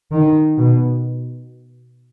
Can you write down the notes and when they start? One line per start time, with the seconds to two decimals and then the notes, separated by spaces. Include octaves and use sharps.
0.12 D#3
0.57 B2